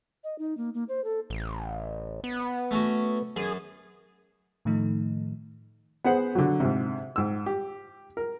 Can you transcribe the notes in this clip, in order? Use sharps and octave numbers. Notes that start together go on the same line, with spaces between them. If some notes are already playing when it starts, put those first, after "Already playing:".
D#5
D#4
A#3
A#3
C5
A4
A1
B3
A3 C#4 F#4
F#2 G#4
A2 D#3 F3 A3 D#4
B3 G#4 C5 F#5
D3 F#3
G#2 C3
G#2 E6
G4
A#4